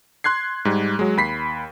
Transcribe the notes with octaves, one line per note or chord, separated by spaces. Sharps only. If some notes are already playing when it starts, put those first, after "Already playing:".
C6 F#6 G#6 C7
G#2 G3
F#3 G#3
D#2 B5 B6 C7